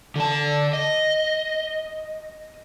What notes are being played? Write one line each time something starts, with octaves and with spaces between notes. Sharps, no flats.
D3 A5
D#5